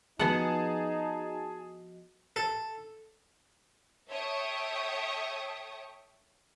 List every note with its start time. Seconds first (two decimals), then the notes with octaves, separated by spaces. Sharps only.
0.19 F3 B3 D#4 F#4 G#4 D#5 F#5 A5
2.36 A4
4.10 A4 C#5 E5 G5 C#6 D#6